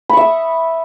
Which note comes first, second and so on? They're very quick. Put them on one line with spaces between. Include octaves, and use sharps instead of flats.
B5 C#6 E5 D#6